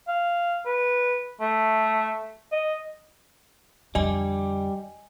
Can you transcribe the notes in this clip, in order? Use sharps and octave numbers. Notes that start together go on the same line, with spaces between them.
F5
B4
A3
D#5
F2 D3 G3 D#5 G#5